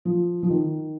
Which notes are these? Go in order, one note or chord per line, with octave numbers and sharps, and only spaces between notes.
F3
F3
D#3